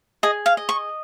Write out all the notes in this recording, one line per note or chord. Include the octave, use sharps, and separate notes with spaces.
G#4 D#5
F5
D#5
C#6